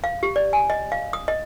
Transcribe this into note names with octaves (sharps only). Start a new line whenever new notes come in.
F5
G4
D5
G#5
D#5
F5
D#6
D#5